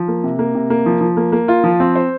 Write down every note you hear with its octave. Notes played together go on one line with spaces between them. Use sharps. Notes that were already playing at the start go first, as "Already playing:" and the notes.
Already playing: F3
A#3
C3
A#3
C3
A#3
F3
F3
A#3
A#3
F4
F3
C4
C5